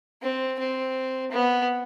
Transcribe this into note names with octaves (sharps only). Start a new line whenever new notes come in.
C4
C4
B3